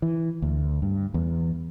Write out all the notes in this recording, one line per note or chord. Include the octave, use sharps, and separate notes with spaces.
E3
D2
G2
E2